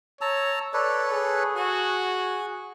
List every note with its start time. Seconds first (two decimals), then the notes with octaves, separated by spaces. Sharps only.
0.21 C#5 A5 A#5 E6
0.74 A4 B4 C#5 D5
1.10 G#4
1.56 F#4 G#5